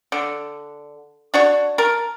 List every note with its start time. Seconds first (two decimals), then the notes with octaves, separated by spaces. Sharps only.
0.12 D3
1.34 D4 F#4 C#5
1.78 A#4 A5